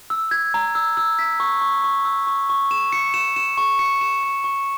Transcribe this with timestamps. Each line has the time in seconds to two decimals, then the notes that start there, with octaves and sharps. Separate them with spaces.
0.10 E6
0.31 G#6
0.54 A#5
0.75 E6
0.97 E6
1.19 B6
1.40 C#6
1.62 C#6
1.84 C#6
2.05 E6
2.27 C#6
2.49 C#6
2.71 E7
2.92 C#7
3.14 E7
3.36 E7
3.58 C#6
3.79 C#7
4.01 E7
4.23 C#6
4.44 C#6